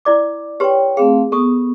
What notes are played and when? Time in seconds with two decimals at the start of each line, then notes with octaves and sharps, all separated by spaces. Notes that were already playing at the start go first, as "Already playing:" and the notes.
0.05 E4 D5 D6
0.60 G4 B4 C#5 G5 C6
0.97 A3 C4 G#4 F5
1.32 B3 A4 C#6 D#6